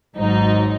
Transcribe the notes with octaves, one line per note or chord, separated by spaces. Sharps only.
G#1 G#2 F#3 D#4